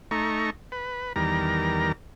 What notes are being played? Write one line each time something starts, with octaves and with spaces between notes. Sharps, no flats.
A3 D#4 A#5 C#6
B4
E2 D#3 G3 A#4 A#5